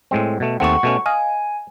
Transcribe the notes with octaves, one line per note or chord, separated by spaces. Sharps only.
A2 G#3 C4
B2 A3
D#2 A3 C4 F#5 C#6
B2 A3 C#4
D#5 F5 G#5